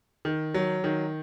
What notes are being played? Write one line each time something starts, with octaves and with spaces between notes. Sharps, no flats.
D#3
F#3
D#3